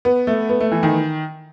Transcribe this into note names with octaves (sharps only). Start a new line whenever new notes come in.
B3
A3
B3
A3
E3
D#3